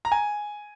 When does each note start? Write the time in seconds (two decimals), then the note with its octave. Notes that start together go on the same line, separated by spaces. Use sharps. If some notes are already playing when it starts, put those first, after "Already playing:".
0.05 A#5
0.12 G#5